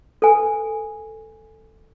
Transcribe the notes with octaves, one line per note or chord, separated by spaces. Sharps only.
A4 B4 G#5